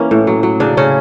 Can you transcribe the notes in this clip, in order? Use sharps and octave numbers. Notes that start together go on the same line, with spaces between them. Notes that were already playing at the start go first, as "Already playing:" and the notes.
Already playing: E3 A#3 C#4
A2
F#3
F#3
C#3 D4
C#3 C#4